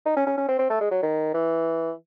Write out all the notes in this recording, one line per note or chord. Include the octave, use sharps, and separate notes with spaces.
D#4
C#4
C#4
C#4
C4
C4
A3
G#3
F#3
D#3
E3